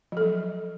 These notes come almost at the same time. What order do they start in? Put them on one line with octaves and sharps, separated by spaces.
F3 A4 F#3